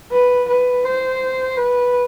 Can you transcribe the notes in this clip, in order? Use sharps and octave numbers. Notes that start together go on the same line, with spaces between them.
B4
B4
C5
B4